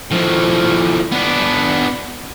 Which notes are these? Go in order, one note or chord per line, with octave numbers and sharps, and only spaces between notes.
A2 F3
B3 D4